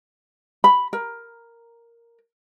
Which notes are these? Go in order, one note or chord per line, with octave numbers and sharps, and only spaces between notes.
B5
A#4